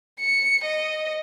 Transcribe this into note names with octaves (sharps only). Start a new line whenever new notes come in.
C#7
D#5